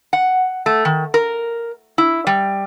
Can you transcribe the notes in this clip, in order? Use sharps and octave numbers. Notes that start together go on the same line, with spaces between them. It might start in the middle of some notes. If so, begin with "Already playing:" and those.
F#5
A3
D#3
A#4
E4
G3